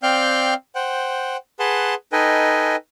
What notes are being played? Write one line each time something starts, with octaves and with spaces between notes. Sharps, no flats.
C4 D5 F5 G5 F6 G6
C5 F#5 G5
G#4 B4 F#5 A5 C6
D#4 A4 B4 D#5 G5 G#5